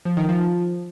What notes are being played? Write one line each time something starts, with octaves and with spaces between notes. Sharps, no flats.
F3
D#3
F3